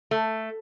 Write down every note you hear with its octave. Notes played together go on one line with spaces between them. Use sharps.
A3